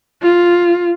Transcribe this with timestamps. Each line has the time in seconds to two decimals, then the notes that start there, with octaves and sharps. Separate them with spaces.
0.22 F4